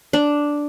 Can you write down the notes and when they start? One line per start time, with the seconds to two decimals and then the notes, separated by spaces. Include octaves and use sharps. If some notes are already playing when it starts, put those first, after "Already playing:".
0.13 D4